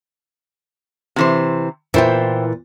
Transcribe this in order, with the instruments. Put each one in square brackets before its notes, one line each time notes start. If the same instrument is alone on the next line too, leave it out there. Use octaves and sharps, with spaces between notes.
[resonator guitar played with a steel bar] C3 E3 C5
[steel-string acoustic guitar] A#2 E3 [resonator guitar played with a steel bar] E4 C5 G5